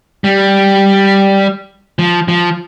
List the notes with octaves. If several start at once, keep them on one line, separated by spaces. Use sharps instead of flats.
G3
F3
F3